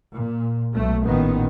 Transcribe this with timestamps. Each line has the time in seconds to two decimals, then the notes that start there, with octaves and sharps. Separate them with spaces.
0.15 A#2
0.74 B1 A3
1.05 A1 A#2 D#3 B3